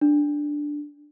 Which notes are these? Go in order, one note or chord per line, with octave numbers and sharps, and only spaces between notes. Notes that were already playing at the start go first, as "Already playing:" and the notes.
D4